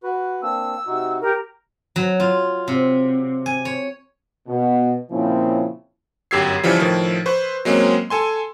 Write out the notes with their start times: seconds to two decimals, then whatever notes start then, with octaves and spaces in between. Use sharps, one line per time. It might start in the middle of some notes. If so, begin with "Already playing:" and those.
0.03 F#4 B4
0.42 A#3 C4 D4 E6
0.87 C3 D#4 F#4
1.22 G4 A#4
1.96 F#3
2.20 F4
2.68 C3
3.46 G#5
3.65 C#5
4.48 B2
5.11 A#2 C#3 F3 C4 C#4 E4
6.31 G1 F#2 G4 E6 G#6 C7
6.64 C#3 E3 F3 G3
6.79 A2 D#3 F3
7.26 B4 C5 C#6
7.65 F#3 G#3 A#3 C4 C#4
8.10 A4 G#5 C6